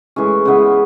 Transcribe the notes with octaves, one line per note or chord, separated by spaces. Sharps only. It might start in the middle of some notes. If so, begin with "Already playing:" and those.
A2 E3 G#3 C#4
C#3 G#3 B3 E4